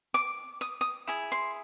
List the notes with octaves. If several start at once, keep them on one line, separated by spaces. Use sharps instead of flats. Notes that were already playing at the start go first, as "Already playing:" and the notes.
D6
D#6
D#6
E4 G#4
C6